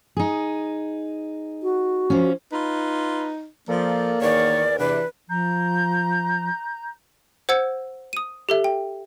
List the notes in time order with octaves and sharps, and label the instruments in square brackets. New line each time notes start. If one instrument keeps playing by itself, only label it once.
[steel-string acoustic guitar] D#4 G#4
[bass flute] F#4
[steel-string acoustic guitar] F3 C#4
[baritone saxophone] D#4 [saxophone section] F4 B4
[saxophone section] F3 [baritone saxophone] A#3 [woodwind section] A4 A#4 D5
[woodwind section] E2 A#4 [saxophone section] D#3 C#5 [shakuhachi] D5
[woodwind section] E2 C3 [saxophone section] E3 D4 [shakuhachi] B4
[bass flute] F3 [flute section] A#5 G6
[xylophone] C5 F#5 E6 G#6 C#7
D#6 D#7
G4 A4 E5
G5